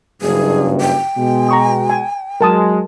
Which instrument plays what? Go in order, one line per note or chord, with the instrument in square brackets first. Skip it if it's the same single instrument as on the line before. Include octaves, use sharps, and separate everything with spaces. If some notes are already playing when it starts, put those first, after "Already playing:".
[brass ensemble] F#1 G2 [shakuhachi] G#4
[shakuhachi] G5
[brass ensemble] B2 G#3
[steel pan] A#5 C#6 D#6
G#5
[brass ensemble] F#3 G#3 [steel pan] A#4 A5 D#6